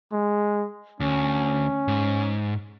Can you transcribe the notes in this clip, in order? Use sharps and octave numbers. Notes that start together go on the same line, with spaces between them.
G#3
D2 C#4
G#2